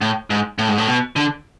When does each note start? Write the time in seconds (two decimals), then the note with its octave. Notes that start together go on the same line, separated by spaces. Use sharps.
0.01 A2
0.30 G#2
0.59 A2
0.68 G#2
0.78 A2
0.88 B2
1.16 D3